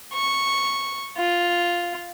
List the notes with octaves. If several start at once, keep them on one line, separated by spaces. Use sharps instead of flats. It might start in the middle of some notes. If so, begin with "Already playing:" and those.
C#6
F4